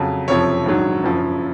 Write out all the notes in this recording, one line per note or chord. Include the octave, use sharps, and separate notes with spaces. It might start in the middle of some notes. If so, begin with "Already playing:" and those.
Already playing: F2 C#3 F#3
F#1 F2 C3 F3 C#5
A#1 G#2 D#3 F#3
F#1 F#2 F3